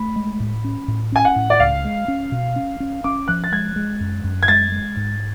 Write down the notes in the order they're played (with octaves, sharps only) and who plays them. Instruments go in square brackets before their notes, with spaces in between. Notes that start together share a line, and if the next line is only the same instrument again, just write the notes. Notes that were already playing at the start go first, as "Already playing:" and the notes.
Already playing: [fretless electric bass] A3 [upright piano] B5
[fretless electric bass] G#3
A2
C#4
A2
[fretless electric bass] C#4 [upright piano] G#5
[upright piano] F#5
[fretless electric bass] A2
[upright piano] D5
[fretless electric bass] C#2 [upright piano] F5
[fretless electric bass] G#3
C#4
B2
C#4
C#4
[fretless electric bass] C#4 [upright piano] D6
[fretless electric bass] F3 [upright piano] F#6
[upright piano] A6
[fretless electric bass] G#3 [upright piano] G#6
[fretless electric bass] G#3
F#2
F#2
[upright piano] G#6
[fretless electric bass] G#3 [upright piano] A6
[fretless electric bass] G#3
G#2